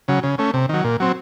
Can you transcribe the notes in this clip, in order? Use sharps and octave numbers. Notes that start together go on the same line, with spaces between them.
C#3 F#3
C#3
A3 C#4
C3
D#3 F#3
A#2
F#3 C4